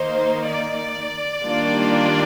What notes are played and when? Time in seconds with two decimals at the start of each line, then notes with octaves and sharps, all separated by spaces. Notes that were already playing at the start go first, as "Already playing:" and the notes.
Already playing: D#3 A#3 D#4 C5
0.51 D5
1.44 D#3 G3 A#3 D4 F4